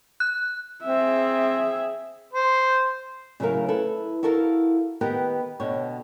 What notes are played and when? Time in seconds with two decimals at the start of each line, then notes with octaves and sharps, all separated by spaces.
0.20 F#6
0.83 C4 G#4 E5
2.33 C5
3.40 C#3 F#3 A3 E4 A#4 F5
3.68 E4 A4 B4
4.23 E4 F#4 A4 A#4 F5
5.01 D#3 B3 G4 A#4 B4
5.60 B2 D3 C#5 G5